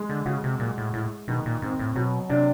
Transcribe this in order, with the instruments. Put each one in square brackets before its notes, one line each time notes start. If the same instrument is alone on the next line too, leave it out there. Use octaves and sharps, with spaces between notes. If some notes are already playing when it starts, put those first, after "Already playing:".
Already playing: [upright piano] G#3
[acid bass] D3
[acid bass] C#3 [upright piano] F#4
[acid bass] C3
[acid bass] A#2 [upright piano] G#3
[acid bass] A2
[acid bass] A2 [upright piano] E4
[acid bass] B2 [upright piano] D#3
[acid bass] A#2
[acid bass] G#2 [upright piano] C4
[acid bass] A2
[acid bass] B2 [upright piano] F#3
[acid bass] C3 [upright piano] D4